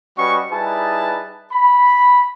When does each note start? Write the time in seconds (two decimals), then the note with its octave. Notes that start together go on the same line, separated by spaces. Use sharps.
0.17 G3 C#4 F#4 B4 D#5 C#6
0.51 G3 D#4 E4 G#4 B4 A5
1.52 B5